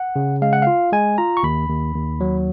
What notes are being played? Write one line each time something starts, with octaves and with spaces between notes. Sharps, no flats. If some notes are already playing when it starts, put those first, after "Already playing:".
Already playing: F#5
C#3
G#3 F5
F#5
F4 F5
G#3 G#5
F4 A#5
C#6
D#2 B5
D#2
D#2
F#3